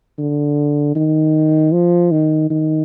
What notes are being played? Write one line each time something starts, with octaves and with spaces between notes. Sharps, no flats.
D3
D#3
F3
D#3
D#3